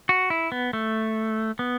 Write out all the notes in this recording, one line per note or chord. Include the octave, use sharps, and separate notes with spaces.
F#4
E4
B3
A3
B3